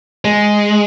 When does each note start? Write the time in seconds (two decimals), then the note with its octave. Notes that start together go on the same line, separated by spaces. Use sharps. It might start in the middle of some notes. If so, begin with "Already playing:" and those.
0.25 G#3